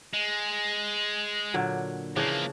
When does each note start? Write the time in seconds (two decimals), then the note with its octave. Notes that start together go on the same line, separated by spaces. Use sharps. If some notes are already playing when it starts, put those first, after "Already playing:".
0.13 G#3
1.54 A#2 D3 F#3
2.16 C#3 E3 F3 A#3 D4